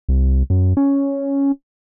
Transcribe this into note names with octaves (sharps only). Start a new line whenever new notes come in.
C2
F#2
C#4